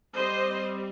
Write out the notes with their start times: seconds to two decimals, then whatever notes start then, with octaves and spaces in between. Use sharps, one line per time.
0.15 G3 C4 C5 D#5